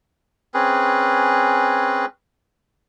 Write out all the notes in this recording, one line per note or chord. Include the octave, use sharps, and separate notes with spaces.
C4 C#4 G#4 B4